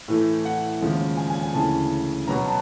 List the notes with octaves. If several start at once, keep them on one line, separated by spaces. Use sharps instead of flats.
A2 E3 A3
F#5
D#2 C#3 F3 G#3
G#5
G#5
G#5
D2 C#3 E3 A5
B2 F#3 B3 A#5
A5